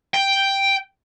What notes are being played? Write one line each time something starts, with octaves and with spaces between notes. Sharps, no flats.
G5